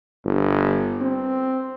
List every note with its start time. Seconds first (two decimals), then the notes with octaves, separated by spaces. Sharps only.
0.25 G1
1.01 C4